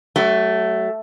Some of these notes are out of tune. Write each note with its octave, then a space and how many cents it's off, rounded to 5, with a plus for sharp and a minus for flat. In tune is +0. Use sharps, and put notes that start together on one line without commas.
F#3 +35 A3 +0